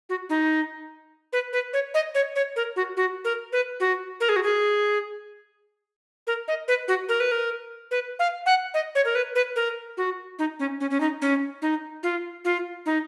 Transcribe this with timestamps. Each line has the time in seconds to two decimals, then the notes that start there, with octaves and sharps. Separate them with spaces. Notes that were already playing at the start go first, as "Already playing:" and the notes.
0.09 F#4
0.30 D#4
1.33 B4
1.53 B4
1.73 C#5
1.94 D#5
2.15 C#5
2.36 C#5
2.56 A#4
2.76 F#4
2.97 F#4
3.25 A#4
3.52 B4
3.80 F#4
4.20 A#4
4.29 G#4
4.36 F#4
4.43 G#4
6.27 A#4
6.48 D#5
6.68 B4
6.88 F#4
7.09 A#4
7.20 B4
7.32 A#4
7.91 B4
8.19 F5
8.46 F#5
8.74 D#5
8.95 C#5
9.05 A#4
9.15 B4
9.35 B4
9.56 A#4
9.97 F#4
10.39 D#4
10.59 C#4
10.80 C#4
10.91 C#4
11.00 D#4
11.22 C#4
11.62 D#4
12.03 F4
12.45 F4
12.86 D#4